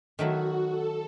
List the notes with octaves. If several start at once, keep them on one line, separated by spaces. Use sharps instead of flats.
D#3 F#3 A3 E4 F#4
A4